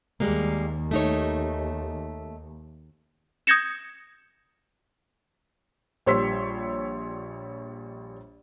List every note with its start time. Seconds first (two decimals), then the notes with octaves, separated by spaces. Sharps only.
0.20 D#2 G3 G#3 A#3
0.91 A3 D#4 C#5
3.47 D#6 G6 G#6 A#6 C#7 E7
6.06 A#1 G3 C#5 C6 E6 B6